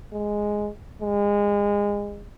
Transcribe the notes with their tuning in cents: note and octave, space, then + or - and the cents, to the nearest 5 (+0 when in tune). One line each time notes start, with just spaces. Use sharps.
G#3 +0
G#3 -25